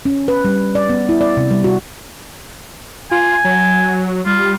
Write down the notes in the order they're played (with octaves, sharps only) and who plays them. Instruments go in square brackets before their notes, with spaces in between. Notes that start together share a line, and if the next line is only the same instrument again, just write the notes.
[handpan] C#4
B4
G3
D5
B3
E4
D5
C3
G3
F#4
[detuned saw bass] F4 [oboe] G#5
[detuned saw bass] F#3
[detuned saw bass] G3 [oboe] F4